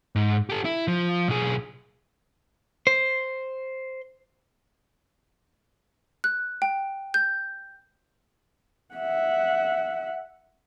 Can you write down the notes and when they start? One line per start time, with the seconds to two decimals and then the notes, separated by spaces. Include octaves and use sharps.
0.16 G#2
0.50 G4 A4
0.65 E4
0.87 F3
1.28 B1 G#4
2.87 C5
6.24 F#6
6.62 G5
7.14 G6
8.94 E5 F#5